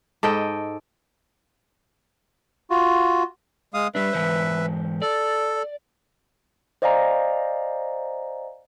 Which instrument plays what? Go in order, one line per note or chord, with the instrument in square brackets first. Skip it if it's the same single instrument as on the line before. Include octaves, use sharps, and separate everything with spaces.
[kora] G#2 A4 D#5 G5
[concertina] F4 F#4
[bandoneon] G#3 F5 D#6
[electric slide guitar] G3 D4 [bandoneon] B4 E5
[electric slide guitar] G#2 E3 C5
[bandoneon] A4 [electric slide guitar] D5
[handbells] C5 D5 D#5 F5 G#5 A#5